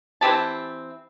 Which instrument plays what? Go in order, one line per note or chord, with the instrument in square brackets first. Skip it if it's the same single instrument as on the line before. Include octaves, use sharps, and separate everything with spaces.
[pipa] E3 C4 G4 A5